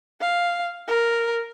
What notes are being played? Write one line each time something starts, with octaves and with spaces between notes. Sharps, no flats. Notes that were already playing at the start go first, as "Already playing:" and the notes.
F5
A#4